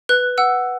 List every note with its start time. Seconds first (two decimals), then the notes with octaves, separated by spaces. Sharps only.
0.09 B4 F#6
0.38 F#5 E6